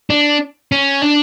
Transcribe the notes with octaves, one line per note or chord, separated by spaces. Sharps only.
D4
C#4
D4